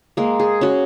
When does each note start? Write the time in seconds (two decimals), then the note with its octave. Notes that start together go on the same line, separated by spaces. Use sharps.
0.17 G#3 A#3
0.40 G#4
0.61 C#4 F#4